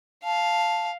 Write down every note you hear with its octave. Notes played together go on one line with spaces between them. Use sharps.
F5 A5